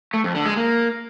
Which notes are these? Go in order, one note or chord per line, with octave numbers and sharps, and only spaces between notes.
A3
F2
D3
G#3
A#3